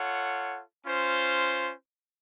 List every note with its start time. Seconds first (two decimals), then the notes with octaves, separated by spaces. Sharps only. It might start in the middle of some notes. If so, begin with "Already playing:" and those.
Already playing: F4 A4 C#5 F#5
0.84 C#4 F4 C5